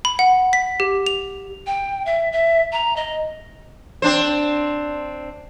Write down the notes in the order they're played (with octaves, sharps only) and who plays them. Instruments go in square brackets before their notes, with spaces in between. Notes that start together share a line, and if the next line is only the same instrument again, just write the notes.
[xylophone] B5
F#5
B6
G4
F7
[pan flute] G5
E5
E5
A#5
D#5
[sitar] C4 D4 C5